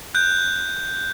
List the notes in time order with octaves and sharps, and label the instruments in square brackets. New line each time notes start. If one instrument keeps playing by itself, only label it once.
[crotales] F#6 G6